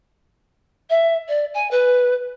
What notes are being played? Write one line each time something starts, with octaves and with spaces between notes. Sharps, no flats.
E5
D5
G#5
B4